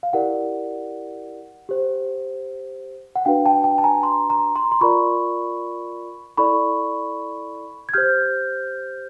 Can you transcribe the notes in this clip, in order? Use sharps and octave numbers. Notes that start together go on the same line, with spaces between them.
F5
E4 G4 A#4 D5 F#5
G4 C5
F#5
D4 F#4 B4 F5 G5
G5 A5
G5 A5
A5
G#5 A#5
A#5 C6
A#5 C6
A#5 C6
C6
F4 A#4 D5 B5 C#6
E4 A4 D5 B5 C#6
G#6
G4 C5 F6 G6